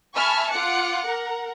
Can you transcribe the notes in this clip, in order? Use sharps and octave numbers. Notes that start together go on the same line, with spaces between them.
E5 G#5 A5 B5 C#6 F6
F4 F#5 D6 F#6 C#7
A#4 F#5